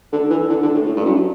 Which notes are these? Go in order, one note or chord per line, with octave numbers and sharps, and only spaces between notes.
D3
E3
D3
D3
A2
A2
G2
F#2